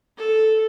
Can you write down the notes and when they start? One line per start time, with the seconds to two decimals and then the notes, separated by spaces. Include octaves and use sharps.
0.17 A4